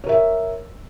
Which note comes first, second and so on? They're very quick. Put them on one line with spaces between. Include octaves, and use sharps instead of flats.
C#5 A#4 E5